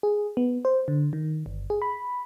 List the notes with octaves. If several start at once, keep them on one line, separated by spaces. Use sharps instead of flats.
G#4
B3
C5
D3
D#3
G1
G#4
B5